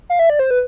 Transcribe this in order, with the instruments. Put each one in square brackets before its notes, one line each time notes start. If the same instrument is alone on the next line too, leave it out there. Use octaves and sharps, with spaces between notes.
[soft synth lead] F5
E5
D5
C5
B4